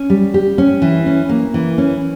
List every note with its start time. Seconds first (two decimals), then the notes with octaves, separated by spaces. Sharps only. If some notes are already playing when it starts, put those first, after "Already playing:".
Already playing: C#4
0.10 G3
0.34 G4
0.58 C#4
0.82 E3
1.06 C#4
1.29 A#3
1.54 E3
1.78 C#4